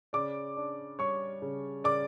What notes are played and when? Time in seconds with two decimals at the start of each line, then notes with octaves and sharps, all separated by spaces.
0.13 C#3 D5 D6
0.57 D4
0.99 G3 C#5 C#6
1.42 C#3
1.84 C#3 D5 D6